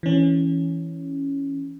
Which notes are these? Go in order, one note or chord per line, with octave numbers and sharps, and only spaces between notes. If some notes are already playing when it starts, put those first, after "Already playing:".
E3 C#4